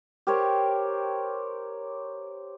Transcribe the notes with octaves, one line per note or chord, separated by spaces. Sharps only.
G4 A#4 C5 C#5